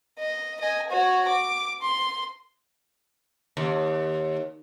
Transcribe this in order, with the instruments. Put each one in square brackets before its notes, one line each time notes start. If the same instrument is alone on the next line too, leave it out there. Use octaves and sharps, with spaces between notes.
[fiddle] D#5
D#5 G#5
F#4 C#5
D6
C6
[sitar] D#2